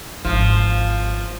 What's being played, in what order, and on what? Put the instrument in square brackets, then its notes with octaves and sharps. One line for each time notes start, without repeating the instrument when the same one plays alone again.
[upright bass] G#1 [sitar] F3